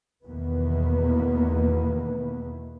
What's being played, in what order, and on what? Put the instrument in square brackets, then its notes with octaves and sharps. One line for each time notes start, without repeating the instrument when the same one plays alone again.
[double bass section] E2 B2 D#3 E3 A#3 B3